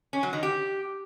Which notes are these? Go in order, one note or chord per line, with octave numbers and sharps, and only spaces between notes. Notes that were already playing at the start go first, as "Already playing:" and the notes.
C#4
F#3
D#3
G4